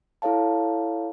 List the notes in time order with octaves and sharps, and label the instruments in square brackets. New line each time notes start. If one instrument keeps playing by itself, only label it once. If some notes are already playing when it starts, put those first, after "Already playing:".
[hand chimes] E4 A4 C#5 F5 A5